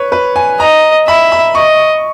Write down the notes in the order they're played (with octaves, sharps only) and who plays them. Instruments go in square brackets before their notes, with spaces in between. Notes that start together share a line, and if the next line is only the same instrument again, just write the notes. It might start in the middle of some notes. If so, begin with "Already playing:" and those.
Already playing: [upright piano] B4 C#5
B4
G#5
[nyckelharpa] D#5 [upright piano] A#5
[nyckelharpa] E5 [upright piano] B5
[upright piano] B5
[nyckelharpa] D#5 [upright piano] C#6